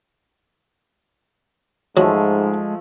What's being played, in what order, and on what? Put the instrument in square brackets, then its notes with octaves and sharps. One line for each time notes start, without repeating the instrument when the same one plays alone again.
[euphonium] G#2 [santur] F3 A3 [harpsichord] F#3 [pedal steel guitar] G#3